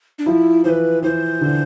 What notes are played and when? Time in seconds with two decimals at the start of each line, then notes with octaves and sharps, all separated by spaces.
0.18 D4
0.26 F3 E4
0.64 E3 B4 C5
1.02 E3 C5
1.41 D3